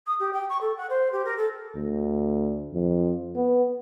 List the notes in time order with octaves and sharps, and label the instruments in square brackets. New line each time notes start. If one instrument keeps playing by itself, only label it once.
[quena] D#6
G4
G5
C#6
A4
F#5
C5
G4
A#4
A4
[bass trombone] D2
F2
B3